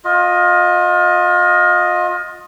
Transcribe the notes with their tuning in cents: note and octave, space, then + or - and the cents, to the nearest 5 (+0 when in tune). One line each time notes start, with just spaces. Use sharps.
F4 +30 D#5 +0